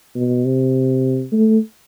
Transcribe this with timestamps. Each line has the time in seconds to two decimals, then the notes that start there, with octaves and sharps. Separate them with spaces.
0.15 B2
0.45 C3
1.32 A3